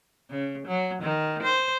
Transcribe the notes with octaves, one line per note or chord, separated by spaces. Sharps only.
C#3
F#3
D#3
C5